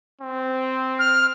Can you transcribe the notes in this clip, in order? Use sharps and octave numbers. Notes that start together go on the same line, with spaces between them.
C4
F6